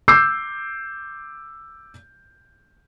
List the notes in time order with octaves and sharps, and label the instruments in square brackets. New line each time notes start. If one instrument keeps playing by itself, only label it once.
[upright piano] D6 E6 G6 C7